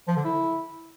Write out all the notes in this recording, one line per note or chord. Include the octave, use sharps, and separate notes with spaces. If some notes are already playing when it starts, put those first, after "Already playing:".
F3
D3
E4